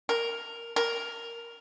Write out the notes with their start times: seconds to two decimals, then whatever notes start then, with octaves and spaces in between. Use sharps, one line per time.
0.09 A#4
0.76 A#4